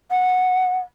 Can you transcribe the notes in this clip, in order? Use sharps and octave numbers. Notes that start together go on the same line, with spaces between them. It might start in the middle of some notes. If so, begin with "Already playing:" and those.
F#5